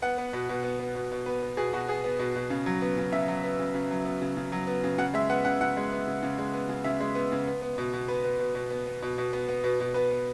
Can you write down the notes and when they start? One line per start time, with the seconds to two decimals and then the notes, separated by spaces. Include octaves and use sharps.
0.02 B3 F#5
0.18 B3
0.33 B2
0.49 B2
0.64 B3
0.80 B3
0.95 B2
1.12 B2
1.26 B3 B4
1.43 B3
1.57 B2 G#4
1.73 B2 F#4
1.88 B3 G#4
2.04 B3
2.19 B2
2.36 B2
2.50 C#3
2.66 F#3
2.82 B3
2.98 C#3
3.12 C#3 E5
3.28 F#3
3.44 B3
3.59 C#3
3.74 C#3
3.91 F#3
4.05 B3
4.22 C#3
4.37 C#3
4.52 F#3
4.67 B3
4.84 C#3
4.98 C#3 F#5
5.14 G#3 E5
5.30 B3 F#5
5.45 C#3 F#5
5.61 C#3 F#5
5.77 G#3
5.92 B3
6.08 C#3
6.23 C#3
6.38 G#3
6.54 B3
6.69 C#3
6.84 C#3 E5
7.00 G#3
7.15 B3
7.32 C#3
7.47 B3
7.62 B3
7.78 B2
7.93 B2
8.08 B3 B4
8.24 B3
8.39 B2
8.55 B2
8.70 B3
8.87 B3
9.02 B2
9.18 B2
9.33 B3
9.49 B3
9.64 B2
9.80 B2
9.94 B3 B4
10.11 B3